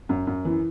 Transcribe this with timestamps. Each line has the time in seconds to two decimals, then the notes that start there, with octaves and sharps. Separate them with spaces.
0.09 F#2
0.27 F#2
0.45 E3